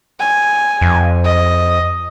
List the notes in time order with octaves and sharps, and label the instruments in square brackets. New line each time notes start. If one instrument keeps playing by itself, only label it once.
[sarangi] G#5
[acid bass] F2
[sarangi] D#5